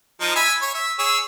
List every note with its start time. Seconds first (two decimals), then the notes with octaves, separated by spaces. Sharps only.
0.21 F3 D#4
0.36 E5 G#5 B5
0.62 C#5
0.74 E5
0.99 G#4 C#5 E6